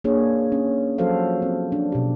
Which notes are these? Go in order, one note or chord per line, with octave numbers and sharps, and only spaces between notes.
A#3 D4 G#4 C#5
C#4
F3 F#3 F#4 A4 C5 F5
C4
D4
B2 G4